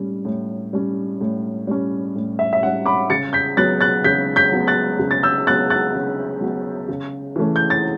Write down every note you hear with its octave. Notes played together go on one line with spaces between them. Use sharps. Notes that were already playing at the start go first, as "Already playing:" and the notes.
Already playing: A2 G3 C#4
A2
G3 C#4
A2
G3 C#4
A2
E5
E5
G3 C#4 F#5
B5 D6
C#3 A6 C#7
G6 B6
F#3 B3 F#6 A6
F#6 A6
C#3 G6 B6
G6 B6
F#3 B3
F#6 A6
C#3
A6
E6 G6
F#3 B3 F#6 A6
F#6 A6
C#3
F#3 B3
C#3
E3 A3 C#4
G6
A6